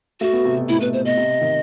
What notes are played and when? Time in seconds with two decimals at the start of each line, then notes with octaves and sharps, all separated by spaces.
0.21 A3 F#4
0.33 B3
0.45 C3
0.57 B2
0.69 A2 E4
0.81 B2 B4
0.93 C5
1.05 B2 D#5
1.17 C3
1.41 D#3